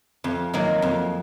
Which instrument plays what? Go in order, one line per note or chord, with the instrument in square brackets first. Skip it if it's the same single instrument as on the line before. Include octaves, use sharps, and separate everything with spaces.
[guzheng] F2
D#3 F#3 A#3
F2